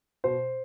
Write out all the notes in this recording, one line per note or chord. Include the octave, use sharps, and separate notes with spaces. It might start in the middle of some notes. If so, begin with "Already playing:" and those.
B2 C5